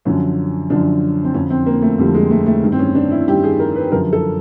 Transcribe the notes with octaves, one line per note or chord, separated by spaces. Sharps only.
F#2 D3 F3 C#4
F#2 D3 F3 D4
C4
F2 D3 F3 C#4
C4
A#3
A3
F2 D3 F3 G3
G#3
A3
A3
G2 D#3
C4
C#4
D4
E4
G2 D#3 G4
G#4
A#4
B4
F#2 D3 F3 A#4
A4